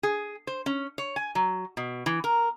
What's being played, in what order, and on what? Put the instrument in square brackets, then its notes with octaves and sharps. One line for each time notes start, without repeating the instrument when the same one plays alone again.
[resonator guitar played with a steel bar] G#4
C5
C#4
C#5
G#5
F#3
B2
E3
A#4